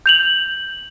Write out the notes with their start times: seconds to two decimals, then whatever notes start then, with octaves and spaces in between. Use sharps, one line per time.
0.06 G6 F7 F#7